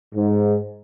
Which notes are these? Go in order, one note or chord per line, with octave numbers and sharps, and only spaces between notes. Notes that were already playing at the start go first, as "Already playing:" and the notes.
G#2